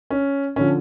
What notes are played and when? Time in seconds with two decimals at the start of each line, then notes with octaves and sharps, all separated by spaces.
0.10 C#4
0.56 D3 F3 C#4